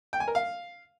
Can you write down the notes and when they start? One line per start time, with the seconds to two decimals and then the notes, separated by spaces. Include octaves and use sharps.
0.13 G5
0.20 G#5
0.28 A#4
0.35 F5